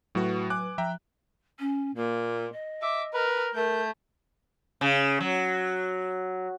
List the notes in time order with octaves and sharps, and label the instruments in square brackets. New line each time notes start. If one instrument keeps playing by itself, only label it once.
[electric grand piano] A2 F#4 [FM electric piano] F#3 B4
[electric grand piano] G#5 D6 F#6
[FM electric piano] F3 [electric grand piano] E5 G5 A#5
[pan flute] C#4
[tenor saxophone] A#2 [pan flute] A#3
[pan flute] D#5
[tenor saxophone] E5 [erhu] D6
[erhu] A#4 [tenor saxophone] B4
[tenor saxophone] A3 [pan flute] A#4 [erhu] G6
[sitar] C#3
F#3